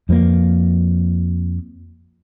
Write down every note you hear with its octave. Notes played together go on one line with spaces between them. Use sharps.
F2 F3 G3 A#3